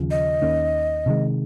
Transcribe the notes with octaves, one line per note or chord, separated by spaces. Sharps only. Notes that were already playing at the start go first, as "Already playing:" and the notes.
Already playing: D#2 C#3 F3
D#5
D#2 D#3 A#3 C#4
C3 D#3 G#3